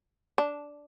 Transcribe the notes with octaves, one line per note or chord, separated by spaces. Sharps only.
D4